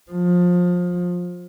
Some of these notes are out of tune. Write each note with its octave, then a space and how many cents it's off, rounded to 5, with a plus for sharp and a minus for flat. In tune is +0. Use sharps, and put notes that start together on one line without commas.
F3 +25